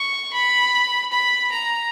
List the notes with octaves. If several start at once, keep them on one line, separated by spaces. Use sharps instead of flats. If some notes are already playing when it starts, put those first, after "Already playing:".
Already playing: C#6
B5
B5
A#5